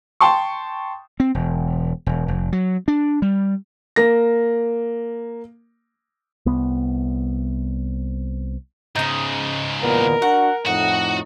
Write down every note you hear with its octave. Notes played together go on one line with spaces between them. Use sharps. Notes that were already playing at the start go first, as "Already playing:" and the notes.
G5 A5 C6 C#6
C4
E1
E1
F1
F#3
D4
G3
A#3 A#6
C2 B3
G#2 C#3 D#4 D#5
E2 A#2 B3 A#4
D4 F#4 F#5
F2 A2 D#4 F#4 F#5